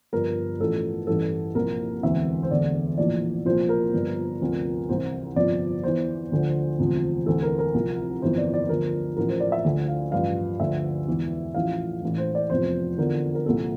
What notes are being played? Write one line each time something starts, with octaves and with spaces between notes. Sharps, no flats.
G1 G2 F3 A#4
A1 A2 F3 A4
A1 G2 E3 A4
C2 A#2 F3 A#4
E1 D2 C3 E3 E5
C5
E1 D2 D3 D5
A#1 A2 E3 D5
C2 A#2 F3 C5
A#4
G1 G2 F3
D2 C3 F3
C2 C3 E3 C5
G1 F2 C3 F3 D5
E2 E3 C5
D2 D3 F3
E1 D2 C3 F3
D2 C3 E3 A4
A#4
A#4
C2 C3 F3
G1 F2 E3 C5
D5
D5
D2 D3 F3 A#4
A1 A2 F3 A#4
C5
D5
E5
D2 D3 F3
F5
A1 G2 F3 F5
D2 D3 F3 E5
E1 E2 E3
A1 A2 F3 F5
A1 A2 E3
C5
D5
F1 E2 C3 F3 C5
E2 D3 F3 A#4
A#4
C2 A#2 F3 A4